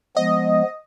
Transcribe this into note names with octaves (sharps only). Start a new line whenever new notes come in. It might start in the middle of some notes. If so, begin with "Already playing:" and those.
F3 G#3 B3 D#5